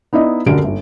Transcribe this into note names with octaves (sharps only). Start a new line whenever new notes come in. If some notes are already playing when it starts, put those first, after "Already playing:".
B3 D#4 E4 D5 D#5
F#1 D2 D3 G4 A#4 D7
G1